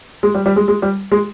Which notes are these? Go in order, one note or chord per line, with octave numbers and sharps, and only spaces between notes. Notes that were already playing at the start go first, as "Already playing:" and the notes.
G#3
G3
G3
G#3
G#3
G3
G#3